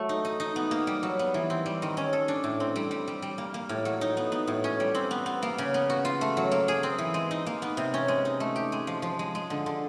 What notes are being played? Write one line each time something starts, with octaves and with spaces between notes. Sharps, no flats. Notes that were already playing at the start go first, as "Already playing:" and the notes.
Already playing: F#3 A3
D#4
D#4
D#4
B3
A#3
G3
F#3
B3
E3
C4
G3
D#3
C#4
A4
D4
A2
C4
G3
G3
G3
G3
A#3
A#3
A2
F#3
D#4
B3
B3
A2
C#4
G3
C4
B3
B3
A#3
C#3
B3
F#4
F4
A3
F#3
A#3
G#4
C4
E3
G#3
D#4
A#3
B3
C3
C#4
G#3
D#4
A3
G4
G#3
F3
F3
G#3
G#3
D3
D3